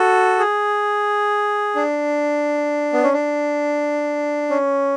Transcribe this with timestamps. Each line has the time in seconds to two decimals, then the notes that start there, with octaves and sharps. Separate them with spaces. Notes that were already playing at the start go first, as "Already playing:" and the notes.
Already playing: F#4 A4
0.39 G#4
1.76 D4
2.93 B3
3.03 C#4
3.13 D4
4.50 C#4